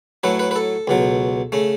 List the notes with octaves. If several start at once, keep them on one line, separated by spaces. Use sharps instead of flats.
A2 F#3 A3 B4
B4
B4
A4
C#2 B2 F#3
C#3 A3